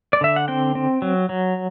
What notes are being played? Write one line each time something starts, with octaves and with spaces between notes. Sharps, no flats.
D5
D3 E5
F#5
C4 G5
C4
F#3
F#3